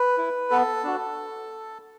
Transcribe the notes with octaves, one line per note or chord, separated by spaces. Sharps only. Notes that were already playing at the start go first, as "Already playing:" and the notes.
Already playing: B4
E4
B3 A4
D4 F#4